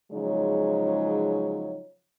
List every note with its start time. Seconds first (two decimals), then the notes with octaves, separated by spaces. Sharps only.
0.11 C#3 F3 F#3 G#3 D#4 C#5